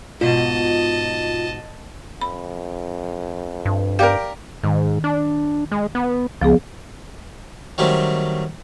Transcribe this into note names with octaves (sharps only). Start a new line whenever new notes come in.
G#2 B2 F4 D#5 A5
F2 B5
G2
G4 A#4 D5 F5
G#2 D#3
D4
G#3
B3
C#2 F3 B3 G#4
D#3 F#3 G3 A3 C4